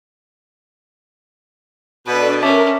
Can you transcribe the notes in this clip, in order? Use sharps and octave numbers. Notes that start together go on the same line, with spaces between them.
B2 D4 A4 B4 D5
C#4 A#4 E5 A5 D6